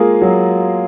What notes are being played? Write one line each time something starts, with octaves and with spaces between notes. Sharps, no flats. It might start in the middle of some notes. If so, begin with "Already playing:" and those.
Already playing: G#3 A#3 F4 G#4
F#3